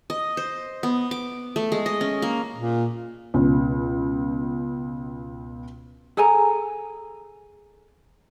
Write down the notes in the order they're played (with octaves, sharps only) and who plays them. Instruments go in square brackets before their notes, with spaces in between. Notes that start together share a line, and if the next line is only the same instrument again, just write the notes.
[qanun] D#5
C5
B3
D6
A3
G#3
D#5
C#4
A#3
[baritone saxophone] A#2
[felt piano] C#2 B2
[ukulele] G#4 A4 G#5 A#5